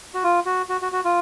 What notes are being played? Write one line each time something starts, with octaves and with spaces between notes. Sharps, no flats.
F#4
F4
F#4
F#4
F#4
F#4
F4